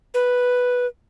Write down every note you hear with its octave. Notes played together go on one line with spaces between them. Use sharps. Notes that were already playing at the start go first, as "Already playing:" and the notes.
B4